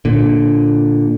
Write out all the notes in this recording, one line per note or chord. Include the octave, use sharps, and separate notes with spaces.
A#2 D3